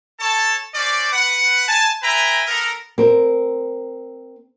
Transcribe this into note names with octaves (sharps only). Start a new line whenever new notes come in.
A4 C#5 A5
C#4 C5 D5
B4 F#5
G#5 A5
B4 E5 G5 G#5 A#5
B3 A4 A#4
C4 A#4